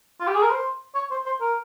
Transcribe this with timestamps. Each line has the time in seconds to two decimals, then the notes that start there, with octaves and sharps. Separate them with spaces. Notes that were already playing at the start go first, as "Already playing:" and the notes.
0.20 F4
0.27 G4
0.35 G#4
0.42 A#4
0.51 C5
0.95 C#5
1.11 C5
1.26 C5
1.41 A#4